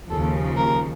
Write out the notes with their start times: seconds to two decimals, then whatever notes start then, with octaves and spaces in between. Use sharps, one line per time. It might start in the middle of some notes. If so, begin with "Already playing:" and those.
0.09 D#2 C#3 F3 A4
0.57 A#4